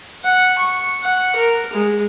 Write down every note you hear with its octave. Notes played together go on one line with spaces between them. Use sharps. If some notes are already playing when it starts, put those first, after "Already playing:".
F#5
C#6
F#5
A#4
G#3